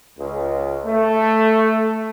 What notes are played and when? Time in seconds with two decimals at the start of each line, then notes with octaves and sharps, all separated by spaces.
0.19 C#2
0.86 A3